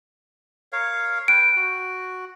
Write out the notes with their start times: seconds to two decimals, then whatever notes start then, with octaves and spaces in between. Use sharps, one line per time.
0.72 A#4 C#5 F5
1.28 B4 G5 D7
1.56 F#4